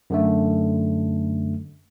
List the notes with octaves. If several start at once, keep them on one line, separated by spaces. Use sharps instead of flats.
F#2 D3 A3